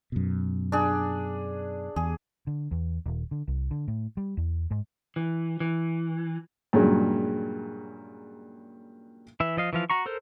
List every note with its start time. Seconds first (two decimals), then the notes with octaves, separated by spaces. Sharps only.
0.12 F#2 B2
0.72 D4 G#4
1.96 E2 G#4
2.47 D3
2.71 E2
3.06 D#1
3.31 D3
3.48 C2
3.71 D3
3.88 A2
4.17 G3
4.37 E2
4.71 G#2
5.16 E3
5.60 E3
6.73 G2 A#2 C#3 F#3 G#3
9.40 E3 E5
9.57 F3 D#5 F5
9.73 E3 F3 F5
9.90 F#4 A#5 C#6
10.06 A4 A#4 C5